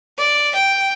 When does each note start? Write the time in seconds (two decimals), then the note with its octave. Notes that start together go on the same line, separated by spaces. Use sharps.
0.18 D5
0.55 G5